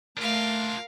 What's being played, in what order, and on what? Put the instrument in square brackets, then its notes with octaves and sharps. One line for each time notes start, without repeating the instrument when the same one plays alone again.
[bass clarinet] A3 [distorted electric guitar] D4 F4 [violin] A#4 F5